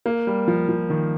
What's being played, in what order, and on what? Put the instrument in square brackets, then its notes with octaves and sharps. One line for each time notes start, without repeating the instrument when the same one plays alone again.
[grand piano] A#3
G3
F3
F3
D#3